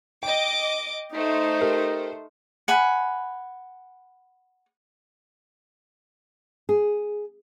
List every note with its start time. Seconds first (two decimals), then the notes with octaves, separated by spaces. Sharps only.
0.23 D#5 G5 D6
1.14 A3 D#4 C5
1.61 G4 A#4
2.68 F#5 G#5 B5
6.69 G#4